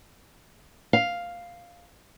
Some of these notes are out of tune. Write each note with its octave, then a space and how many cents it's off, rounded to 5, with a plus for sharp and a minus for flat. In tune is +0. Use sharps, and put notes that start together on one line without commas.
F5 +0